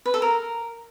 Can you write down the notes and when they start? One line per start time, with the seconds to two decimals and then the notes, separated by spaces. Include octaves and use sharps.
0.06 B4
0.14 A4
0.22 A#4